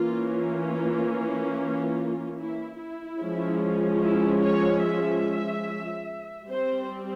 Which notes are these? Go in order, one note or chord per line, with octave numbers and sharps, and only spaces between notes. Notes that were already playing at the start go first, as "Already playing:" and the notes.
Already playing: E3 A#3 C#4 F4
F4
F4
E4
E4
F3 G#3 C#4
E4
C#5
E5
G3 C4 C5